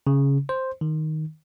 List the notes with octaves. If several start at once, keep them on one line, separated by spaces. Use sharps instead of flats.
C#3
C5
D#3